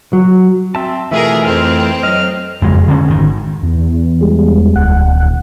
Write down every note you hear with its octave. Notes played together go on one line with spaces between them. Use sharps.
F#3
C4 E5 A5
B2 E3 A3 F4 G#4 A#4 E5
F2 C4 F6
F#3 D#5 F6
F#1 F2 G#3
D3 C#4
G#1 D#3
E2
G3 G#3
D#1 D2 F#5